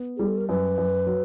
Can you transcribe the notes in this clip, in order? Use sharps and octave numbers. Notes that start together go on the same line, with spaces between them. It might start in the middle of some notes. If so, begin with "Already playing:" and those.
Already playing: B3
G3 G#4
A4
A#4
F#2 B4
F#2
F#3